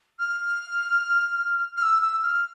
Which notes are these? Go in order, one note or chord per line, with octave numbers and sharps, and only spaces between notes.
F6
F6
E6
E6
F6